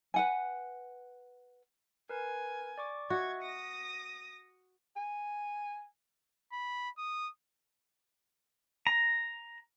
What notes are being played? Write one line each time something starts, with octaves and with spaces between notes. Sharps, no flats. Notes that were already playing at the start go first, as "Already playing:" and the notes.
B4 F#5 G#5
A#4 B4 G#5
D5 C#6 D6
F#4 D#5 E5 C#6 G#6
D#6 A#6 C#7
G#5
B5
D#6
A#5